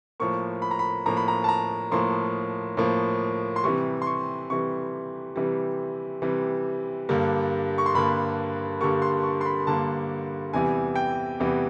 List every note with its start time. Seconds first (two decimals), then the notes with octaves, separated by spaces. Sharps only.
0.20 A2 F3 A#3 C#6
0.62 B5
0.71 A#5
0.79 B5
1.06 A2 F3 A#3 A#5
1.17 B5
1.28 A#5
1.44 A5
1.49 A#5
1.91 A2 F3 A#3 C6
2.77 A2 F3 A#3
3.56 C6
3.64 C3 E3 G3 C#6
4.02 C6
4.07 C#6
4.50 C3 E3 G3 C#6
5.36 C3 E3 G3
6.22 C3 E3 G3
7.09 G2 D3 G3 A#3
7.78 C#6
7.86 C6
7.95 G2 D3 G3 A#3 B5
8.81 G2 D3 G3 A#3 C#6
9.02 C6
9.23 C#6
9.41 C6
9.45 B5
9.66 G2 D3 G3 A#3 A5
10.53 E2 C3 E3 G3 G#5
10.96 G5
11.40 E2 C3 E3 G3